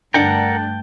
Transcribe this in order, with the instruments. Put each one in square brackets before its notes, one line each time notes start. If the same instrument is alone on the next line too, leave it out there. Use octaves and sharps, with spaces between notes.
[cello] G2 A3 [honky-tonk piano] D3 D4 [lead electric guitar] A#4 F#5 [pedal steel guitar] G5 A5